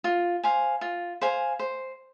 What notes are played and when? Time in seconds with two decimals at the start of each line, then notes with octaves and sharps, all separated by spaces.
0.04 F4
0.43 C5 F5 G#5
0.81 F4
1.21 C5 F5 G#5
1.59 C5